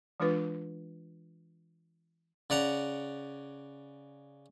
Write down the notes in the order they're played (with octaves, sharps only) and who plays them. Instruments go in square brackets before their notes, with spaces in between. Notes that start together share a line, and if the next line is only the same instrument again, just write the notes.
[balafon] E3 G#3 D4 F4 B4
[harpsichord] C#3 D5 F#5 A#5